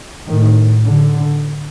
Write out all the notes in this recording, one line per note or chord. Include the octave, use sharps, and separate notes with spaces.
A2 D#3
D3